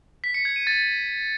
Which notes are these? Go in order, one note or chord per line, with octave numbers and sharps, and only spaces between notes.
B6
C#7
G#6
D#7
A6